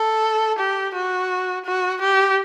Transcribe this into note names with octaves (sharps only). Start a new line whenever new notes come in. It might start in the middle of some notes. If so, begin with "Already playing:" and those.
Already playing: A4
G4
F#4
F#4
G4